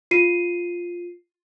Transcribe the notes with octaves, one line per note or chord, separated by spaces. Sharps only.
F4 C7 D#7